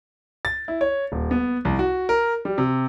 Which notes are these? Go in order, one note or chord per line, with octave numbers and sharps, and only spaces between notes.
A6
E4
C#5
D#1
B3
C2
F#4
A#4
G3
C3